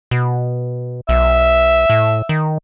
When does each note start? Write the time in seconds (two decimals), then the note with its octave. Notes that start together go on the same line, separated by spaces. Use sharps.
0.11 B2
1.09 B1 E5
1.90 A2
2.29 D#3